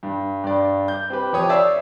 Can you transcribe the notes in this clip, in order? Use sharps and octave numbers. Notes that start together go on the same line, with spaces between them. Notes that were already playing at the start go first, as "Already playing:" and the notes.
G2
G2 D5
G6
C4 G4 B4
F2 G4 C#5 D#6
C#5 D5 E5 E6 C7